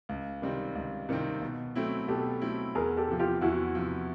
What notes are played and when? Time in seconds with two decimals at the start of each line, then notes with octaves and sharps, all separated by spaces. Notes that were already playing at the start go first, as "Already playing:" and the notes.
0.09 C#2
0.42 C3 D#3 G3 C4
0.75 C#2
1.09 C3 D#3 G3 C4
1.42 B2
1.76 F#3 A3 C4 E4
2.08 B2 G4 A4
2.42 F#3 A3 C4 E4
2.75 E2 G#4 A#4
2.97 G4 A4
3.08 C3 F3
3.19 F4 G4
3.41 E2 E4 F#4
3.75 C3 F3